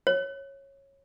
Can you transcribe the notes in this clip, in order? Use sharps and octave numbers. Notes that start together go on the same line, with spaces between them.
C#5